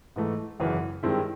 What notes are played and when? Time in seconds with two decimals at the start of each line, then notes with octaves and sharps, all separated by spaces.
0.16 G#2 E3 A3
0.60 G#1 F#2 C#3 E3
1.03 G2 D#3 G#3 C4 E4